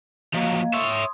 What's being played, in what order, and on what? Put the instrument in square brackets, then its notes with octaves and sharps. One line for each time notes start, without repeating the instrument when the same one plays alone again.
[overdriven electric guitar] F3 F#3 [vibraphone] A#3 D#5 F5
[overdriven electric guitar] C#5 E5 [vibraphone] C6 D#6